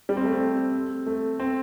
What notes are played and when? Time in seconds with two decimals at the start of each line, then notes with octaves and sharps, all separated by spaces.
0.09 G3
0.17 C4
0.25 A3
0.33 C4
1.06 A3
1.40 C4